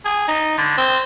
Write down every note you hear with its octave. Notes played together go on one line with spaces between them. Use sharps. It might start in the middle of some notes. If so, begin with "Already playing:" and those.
G#4
D#4
D3
C4